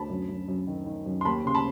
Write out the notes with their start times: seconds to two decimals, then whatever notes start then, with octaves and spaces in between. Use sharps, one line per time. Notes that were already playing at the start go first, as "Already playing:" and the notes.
Already playing: D2 A5 B5
0.10 F#2
0.29 F#2
0.48 F#2
0.67 D#3
0.86 D#3
1.06 F#2
1.21 C6
1.25 D#2 A5 B5
1.44 C#3 C6
1.55 A5 B5